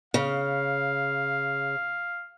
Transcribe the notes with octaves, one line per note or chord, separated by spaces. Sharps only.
C#3 F5